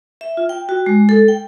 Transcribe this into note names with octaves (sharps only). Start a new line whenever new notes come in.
E5
F4
G5
F#4
G#3
A4
G5